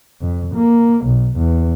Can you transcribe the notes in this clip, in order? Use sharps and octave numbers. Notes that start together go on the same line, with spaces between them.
F2
A#3
B1
E2